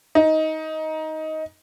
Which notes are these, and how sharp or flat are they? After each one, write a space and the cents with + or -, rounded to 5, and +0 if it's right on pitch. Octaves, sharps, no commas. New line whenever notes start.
D#4 +15